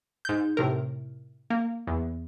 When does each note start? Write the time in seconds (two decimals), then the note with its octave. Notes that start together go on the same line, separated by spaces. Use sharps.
0.25 G#2 G6
0.57 A2 C3 A#4
1.50 A#3
1.87 E2